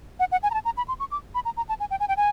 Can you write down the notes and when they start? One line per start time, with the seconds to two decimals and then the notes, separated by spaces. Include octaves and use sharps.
0.20 F#5
0.32 F#5
0.43 G#5
0.51 A#5
0.54 A5
0.65 A#5
0.77 B5
0.88 C6
1.00 C#6
1.12 D6
1.35 B5
1.45 A#5
1.57 A#5
1.69 A5
1.80 G#5
1.91 G5
2.00 G#5
2.08 G5
2.17 G#5